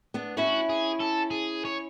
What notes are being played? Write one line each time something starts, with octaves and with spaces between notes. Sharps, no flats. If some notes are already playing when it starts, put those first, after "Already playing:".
B3 D4
C#4 E4 F#4
G#4
A4
G#4
C#5